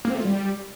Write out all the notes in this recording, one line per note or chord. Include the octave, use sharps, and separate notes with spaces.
A#3
C4
A3
F4
G3